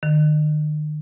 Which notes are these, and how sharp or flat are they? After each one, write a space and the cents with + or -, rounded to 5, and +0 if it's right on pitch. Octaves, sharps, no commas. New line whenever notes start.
D#3 -40